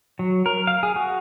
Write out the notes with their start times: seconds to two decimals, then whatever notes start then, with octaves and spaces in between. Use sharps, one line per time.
0.19 F#3
0.46 A#4
0.67 F5
0.83 G#4
0.96 F#4